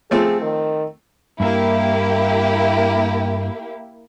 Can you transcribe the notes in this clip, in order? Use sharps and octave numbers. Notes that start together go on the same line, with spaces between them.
F3 A3 C4 G#4
D#3
G2 A#3 E4 G4 E5